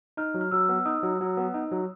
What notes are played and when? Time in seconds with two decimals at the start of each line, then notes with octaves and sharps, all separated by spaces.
0.17 D#4 F6
0.34 F#3
0.41 F6
0.51 F#3 E6
0.69 B3
0.86 D#4 D#6
1.03 F#3
1.21 F#3
1.37 B3
1.54 D#4
1.71 F#3